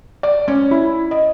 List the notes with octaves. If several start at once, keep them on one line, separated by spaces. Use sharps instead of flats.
D5
C#4
E4
D#5